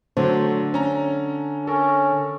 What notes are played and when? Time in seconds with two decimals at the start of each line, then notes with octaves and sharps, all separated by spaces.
0.17 D3 F#3 A3 C5
0.74 C#4 A#5
1.67 C#4 A4 A#4